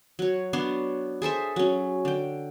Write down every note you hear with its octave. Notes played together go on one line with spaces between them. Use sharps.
F#3 C#5
B3 D4 C#5 C6
G#4 A4 C5 E5
F#3 C#4
D3 G5